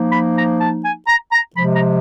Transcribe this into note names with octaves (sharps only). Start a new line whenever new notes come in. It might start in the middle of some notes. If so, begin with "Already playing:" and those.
Already playing: F3 A#3 D#4
B5
A#5
A5
G#5
A#5
A#5
C3 F3 G#3 B5
A#5